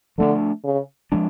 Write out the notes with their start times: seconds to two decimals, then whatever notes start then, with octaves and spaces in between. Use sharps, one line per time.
0.18 D3 F3 A3 D4
0.64 C#3
1.12 F3 G#3 D4